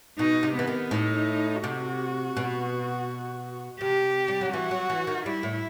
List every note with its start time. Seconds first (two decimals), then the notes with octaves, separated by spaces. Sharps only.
0.19 B2 D#4
0.43 C3
0.55 E3 B3
0.67 D#3
0.91 A2 D#4
1.63 C3 F#4
2.37 B2
3.81 C3 G4
4.28 G3
4.41 F#3
4.53 E3 F#4
4.71 F#3
4.90 E3
5.07 D#3
5.26 G3 E4
5.43 A2